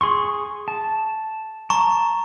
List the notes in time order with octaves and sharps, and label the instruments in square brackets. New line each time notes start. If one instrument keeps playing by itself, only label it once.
[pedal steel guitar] G#4 C6 C#6
A5
[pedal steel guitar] A5 [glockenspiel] A#5 C#6